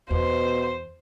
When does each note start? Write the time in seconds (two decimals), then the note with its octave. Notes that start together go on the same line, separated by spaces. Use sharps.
0.10 E2 B2 C5